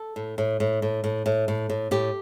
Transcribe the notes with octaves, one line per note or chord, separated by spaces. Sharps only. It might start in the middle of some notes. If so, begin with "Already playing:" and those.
Already playing: A4
A2
A2
A2
A2
A2
A2
A2
A2
A2 G4